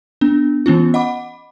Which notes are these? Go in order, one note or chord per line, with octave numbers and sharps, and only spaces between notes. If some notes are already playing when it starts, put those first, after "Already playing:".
B3 D4
E3 B3 C#4 F4
D#5 F#5 B5 D6